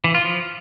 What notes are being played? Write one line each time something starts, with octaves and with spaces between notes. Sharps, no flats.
E3
F4
F3